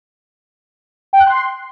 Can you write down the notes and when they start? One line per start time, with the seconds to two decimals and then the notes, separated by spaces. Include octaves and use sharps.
1.13 G5
1.20 F#6
1.27 C6